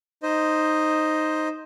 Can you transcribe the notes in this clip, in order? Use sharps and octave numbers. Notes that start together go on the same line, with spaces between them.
D#4 C5 D#5